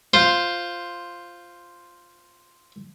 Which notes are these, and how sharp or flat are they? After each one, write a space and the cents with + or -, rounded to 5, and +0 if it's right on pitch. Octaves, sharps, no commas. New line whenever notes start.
F4 +0 C5 +0